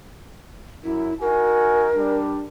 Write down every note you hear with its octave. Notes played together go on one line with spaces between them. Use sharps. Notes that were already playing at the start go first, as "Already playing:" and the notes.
F#2 E4
D#4 F#4 A#4 G#5
G3 D4